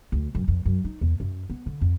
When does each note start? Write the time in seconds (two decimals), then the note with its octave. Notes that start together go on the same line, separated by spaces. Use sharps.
0.12 D2
0.35 F#2
0.48 F2
0.66 F#2
0.85 D#4
1.01 E2
1.20 F#2
1.50 B3
1.66 D3
1.81 F2